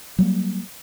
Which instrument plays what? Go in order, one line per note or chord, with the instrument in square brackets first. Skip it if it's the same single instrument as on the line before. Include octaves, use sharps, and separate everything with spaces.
[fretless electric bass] F#3 G3 A#3